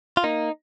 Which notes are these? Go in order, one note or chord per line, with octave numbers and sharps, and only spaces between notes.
F4
A#3 D#4